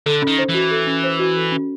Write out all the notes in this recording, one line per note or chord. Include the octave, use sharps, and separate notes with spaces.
D3 A4
C#4
D#3
C5
E3 F#4
A4
C#4
C5
F#4
A4
C#4